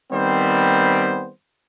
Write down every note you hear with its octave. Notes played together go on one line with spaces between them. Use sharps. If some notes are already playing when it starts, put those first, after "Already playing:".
D#3 G3 B3 C4 C5